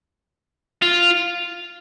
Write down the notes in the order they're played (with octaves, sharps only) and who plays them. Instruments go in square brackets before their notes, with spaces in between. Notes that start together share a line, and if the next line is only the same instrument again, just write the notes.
[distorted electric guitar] F4